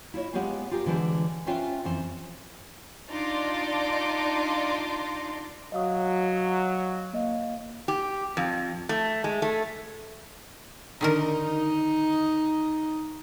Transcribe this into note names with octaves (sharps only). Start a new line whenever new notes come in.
E4 F4 C#5 D#5
G#3 B3 F4 G4 C#5 F5
F4 G4 G#4 A#4
D3 E3 G#3 C5
C#4 F4 B4 C5 E5 G5
F2 E3 C5
D4 D#4 F4 D5 C6 D6
F#3 D#5 F5 D#6
A#3 D#5 F5
G4
F2
A3
G#3
A3
D3 D#3 D#4 A#4